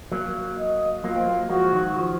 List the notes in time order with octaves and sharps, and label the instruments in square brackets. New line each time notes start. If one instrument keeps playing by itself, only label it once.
[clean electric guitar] F#3 A#3
[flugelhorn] D#5
[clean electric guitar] F#3 A#3 [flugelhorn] F4
[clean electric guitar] C4
F#3 A#3
[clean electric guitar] F3 G#3 [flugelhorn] F#4
[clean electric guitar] D#3 F#3
F3